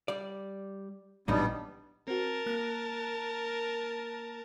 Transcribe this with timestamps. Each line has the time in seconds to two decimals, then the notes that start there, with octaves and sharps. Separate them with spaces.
0.08 G3 D5
1.28 A#1 A2 E3 F#3 G3 B3 D4 D#4
2.08 C4 F#4 A#4 A5
2.46 A#3 F#6